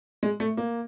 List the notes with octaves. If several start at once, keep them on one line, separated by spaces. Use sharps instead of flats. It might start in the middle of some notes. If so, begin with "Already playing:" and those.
G#3
A3
A#3